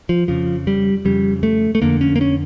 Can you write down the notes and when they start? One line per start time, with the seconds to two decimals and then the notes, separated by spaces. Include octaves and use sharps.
0.09 F3
0.28 F2 C#3 F3
0.67 G3
1.05 F2 C#3 G3
1.43 A3
1.75 A3
1.82 F2 D3 A#3
2.01 C#4
2.16 A#3
2.21 C#4